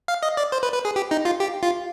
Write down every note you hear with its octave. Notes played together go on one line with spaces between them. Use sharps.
F5
D#5
D5
C5
B4
B4
G#4
G4
D#4
F4
G4
F4